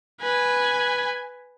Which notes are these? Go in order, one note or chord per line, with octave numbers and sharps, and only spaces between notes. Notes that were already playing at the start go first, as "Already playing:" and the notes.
B4 G#5